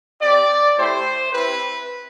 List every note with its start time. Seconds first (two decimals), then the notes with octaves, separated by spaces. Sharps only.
0.21 C4 G4 D5
0.77 A3 E4 G4 C5
1.32 C4 E4 G4 B4